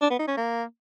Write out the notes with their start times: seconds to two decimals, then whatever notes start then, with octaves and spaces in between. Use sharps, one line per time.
0.01 D4
0.10 B3
0.19 D#4
0.28 C#4
0.37 A#3